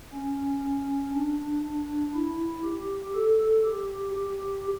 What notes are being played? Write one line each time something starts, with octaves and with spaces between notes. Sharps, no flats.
C#4
D4
D4
E4
G4
A4
G4
G4